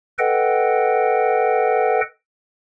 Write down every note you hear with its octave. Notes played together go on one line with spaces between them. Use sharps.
A4 B4 D#5 F#5 G5